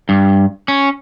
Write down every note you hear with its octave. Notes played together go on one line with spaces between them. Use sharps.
G2
C#4